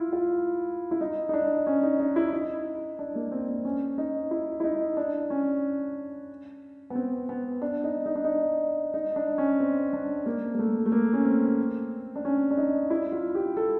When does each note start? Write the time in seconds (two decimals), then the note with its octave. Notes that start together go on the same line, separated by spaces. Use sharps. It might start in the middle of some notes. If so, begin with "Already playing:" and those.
Already playing: E4 F4
0.13 F4
0.91 E4
1.01 D#4
1.29 D#4
1.33 D4
1.67 C#4
1.83 D#4
2.00 D#4
2.16 E4
2.33 D#4
2.99 D4
3.15 A#3
3.32 C4
3.49 C4
3.65 C#4
3.98 D#4
4.31 E4
4.60 E4
4.64 D#4
4.97 D4
5.30 C#4
6.90 B3
6.95 C4
7.29 B3
7.62 D4
7.84 D#4
8.06 D#4
8.15 D4
8.24 D#4
8.94 D#4
9.16 D4
9.38 C#4
9.60 C4
9.93 D4
10.26 A#3
10.55 A#3
10.59 A3
10.86 A3
10.92 A#3
11.13 C#4
11.25 C4
12.16 D4
12.25 C#4
12.51 D4
12.57 D#4
12.90 E4
13.12 F4
13.35 G4
13.57 A4